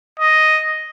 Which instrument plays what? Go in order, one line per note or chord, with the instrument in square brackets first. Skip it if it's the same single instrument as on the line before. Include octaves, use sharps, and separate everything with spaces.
[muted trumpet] D#5